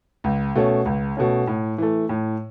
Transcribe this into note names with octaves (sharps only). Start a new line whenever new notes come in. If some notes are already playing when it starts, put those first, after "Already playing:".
C#2
B2 A3 C#4
C#2
B2 A3 C#4
A2
E3 A3
A2